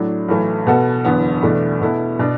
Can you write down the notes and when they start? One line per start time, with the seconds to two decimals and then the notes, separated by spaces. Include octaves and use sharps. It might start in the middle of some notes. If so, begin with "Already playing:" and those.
Already playing: A2 F#3 A3 D4
0.28 B1 A2 E3 A3
0.67 B2 B3 F#4 A4
1.05 F#1 E2 D3 B3
1.43 E2 B2 A3 D4
1.81 B2 B3 E4 A4
2.19 B2 B3 D4